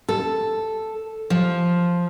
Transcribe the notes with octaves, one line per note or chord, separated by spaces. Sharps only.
A4
F3